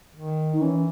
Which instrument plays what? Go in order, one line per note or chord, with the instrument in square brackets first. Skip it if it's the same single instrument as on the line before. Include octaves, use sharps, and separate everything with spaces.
[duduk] D#3
[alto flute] D#4
[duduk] E3 [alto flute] C#4